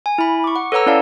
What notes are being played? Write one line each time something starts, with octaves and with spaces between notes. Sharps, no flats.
G#5
E4 B5
C#6 D6
F#5
A4 B4 C#5 F#5 A#5 E6
C#4 E4 D5 F5 A5